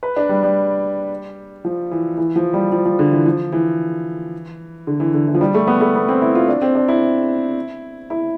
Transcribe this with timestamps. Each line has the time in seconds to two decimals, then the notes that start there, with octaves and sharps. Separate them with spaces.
0.03 B4
0.16 D4
0.29 G3
0.43 G3
1.65 F3
1.91 E3
2.17 E3
2.36 F3
2.53 G3
2.72 F3
2.85 F3
2.99 D3
3.12 E3
3.26 F3
3.52 E3
4.87 D3
5.00 E3
5.14 D3
5.28 E3
5.34 F3
5.41 G3
5.55 A3
5.67 B3
5.81 A3
5.95 B3
6.08 C4
6.22 E4
6.35 F4
6.48 D4
6.62 C4
6.75 D4
6.88 E4
8.10 E4